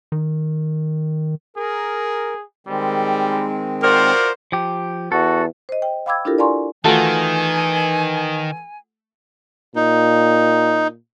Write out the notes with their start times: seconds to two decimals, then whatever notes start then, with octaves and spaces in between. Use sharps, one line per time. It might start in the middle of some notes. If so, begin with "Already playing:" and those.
0.12 D#3
1.57 G#4 A#4
2.67 D#3 G3 G#3 C4
3.83 F4 F#4 A#4 C5 D5
4.52 F3 G4
5.12 E2 F#4 A4
5.69 C5 D#5
5.82 G5
6.06 F5 G5 B5 D6 E6 G#6
6.25 D4 E4 F4 G4 A4 A#4
6.38 D5 F5 G#5 A#5 C6 C#6
6.85 D#3 E3 A3 F4 F#4 G#5
9.76 A#2 D#4